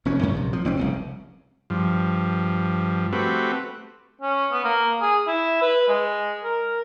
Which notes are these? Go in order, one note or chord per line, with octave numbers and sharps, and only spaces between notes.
F1 F2 C#4
F#2 F#3 C#4
A#1 C3
F3
F#1 C4 C#4
F1 C2 C#3
G2 F3
A3 C4 F#4 G4 B4
C#4
B3
A#3
G#4
E4
B4
G#3
A#4